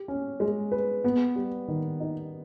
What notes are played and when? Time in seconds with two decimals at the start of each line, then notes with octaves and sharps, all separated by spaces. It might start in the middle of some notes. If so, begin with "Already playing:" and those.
Already playing: G4
0.08 C#4
0.40 G#3
0.72 B4
1.04 B3
1.36 G3
1.68 D#3
2.00 D#4